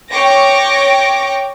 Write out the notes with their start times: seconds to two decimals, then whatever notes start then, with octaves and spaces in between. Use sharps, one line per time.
0.10 C#5 G5 C#6 D6 A#6